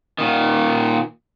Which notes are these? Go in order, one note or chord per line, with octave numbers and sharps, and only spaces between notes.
A#2 D#3